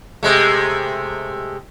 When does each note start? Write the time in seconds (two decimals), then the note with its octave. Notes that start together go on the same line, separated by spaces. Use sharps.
0.23 C3 G#3 A3